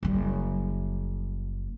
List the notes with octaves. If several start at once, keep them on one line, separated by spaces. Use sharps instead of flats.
F#1 G3